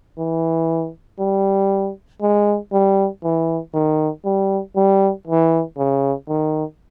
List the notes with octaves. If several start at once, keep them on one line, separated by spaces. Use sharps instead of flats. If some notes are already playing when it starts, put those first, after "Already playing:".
E3
G3
G#3
G3
E3
D#3
G3
G3
E3
C#3
D#3